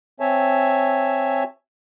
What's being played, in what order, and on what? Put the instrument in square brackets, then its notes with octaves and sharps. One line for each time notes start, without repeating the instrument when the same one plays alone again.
[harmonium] C4 C#5 E5 G#5 A5